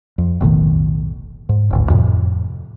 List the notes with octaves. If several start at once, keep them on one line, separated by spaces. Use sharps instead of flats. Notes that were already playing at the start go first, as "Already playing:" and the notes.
F2
F1 B1 A2 D#3
G#2
E1 A1 D2
F2 A2 C3